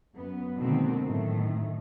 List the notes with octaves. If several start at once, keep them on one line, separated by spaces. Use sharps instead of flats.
F#2 B3
B2 D3 D#3 G#3 A#3 C4
F#2 A2 D#3 A3